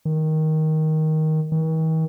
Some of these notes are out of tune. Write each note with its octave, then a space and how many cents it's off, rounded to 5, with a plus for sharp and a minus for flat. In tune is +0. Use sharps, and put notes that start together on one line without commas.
D#3 +10
D#3 +45